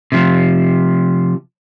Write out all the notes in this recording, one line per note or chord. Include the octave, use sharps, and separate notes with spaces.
C3 F3